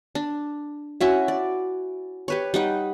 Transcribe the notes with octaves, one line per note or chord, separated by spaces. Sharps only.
D4
C#4 E4 F#4 E5
D5
G4 B4 C#5
G3 D#4 F#5